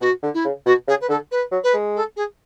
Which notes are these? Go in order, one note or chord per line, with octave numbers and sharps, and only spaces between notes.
B2 F#4
D3
E4
C#3
B2 F#4
C#3 G#4
B4
D3 A4
B4
F#3
B4
G#3
A4
G#4